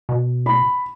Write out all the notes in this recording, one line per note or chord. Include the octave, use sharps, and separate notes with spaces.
B2
B5